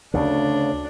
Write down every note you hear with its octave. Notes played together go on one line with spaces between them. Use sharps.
D2 C#3 D4